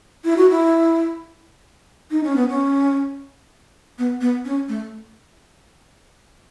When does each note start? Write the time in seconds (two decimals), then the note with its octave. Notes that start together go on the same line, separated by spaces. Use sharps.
0.25 E4
0.37 F#4
0.50 E4
2.11 D#4
2.23 C#4
2.36 B3
2.48 C#4
3.98 B3
4.21 B3
4.45 C#4
4.69 A3